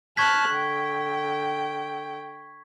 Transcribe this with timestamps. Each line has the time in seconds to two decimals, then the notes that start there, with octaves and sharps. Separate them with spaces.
0.17 A5 C#6 F6 F#6 G#6 B6
0.52 D3 G5